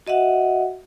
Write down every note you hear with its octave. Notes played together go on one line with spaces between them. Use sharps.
F#4 D#5 E5 F#5